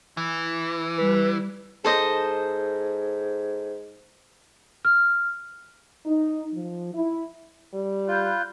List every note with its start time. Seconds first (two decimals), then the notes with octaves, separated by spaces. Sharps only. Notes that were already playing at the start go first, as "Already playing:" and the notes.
0.17 E3
0.98 G3 B4
1.85 G#2 A4 C5 D#5
4.85 F6
6.06 D#4
6.53 F3
6.94 E4
7.74 G3
8.08 F4 B5 F#6 G6